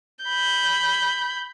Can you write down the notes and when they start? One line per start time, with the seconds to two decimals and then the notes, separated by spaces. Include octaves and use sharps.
0.25 B5 G6